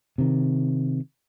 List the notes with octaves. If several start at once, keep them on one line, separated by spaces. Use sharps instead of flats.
C3 D#3